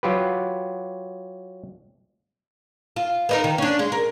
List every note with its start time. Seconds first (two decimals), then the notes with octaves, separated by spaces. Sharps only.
0.03 F#3 F4 G4 B4
2.96 F4
3.29 B3 D#4 A#4
3.44 D#3
3.58 C#4 D4
3.79 G#3
3.92 A#4